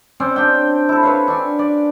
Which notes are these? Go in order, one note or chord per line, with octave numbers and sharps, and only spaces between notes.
C4 C#4 C5 D5
D4 G4 G5
E4 A4
C4 B4 C#5 F5
D4 G#5 C#6
D5